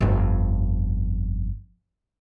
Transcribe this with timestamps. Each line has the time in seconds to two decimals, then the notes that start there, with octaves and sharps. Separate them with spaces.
0.01 G1 F2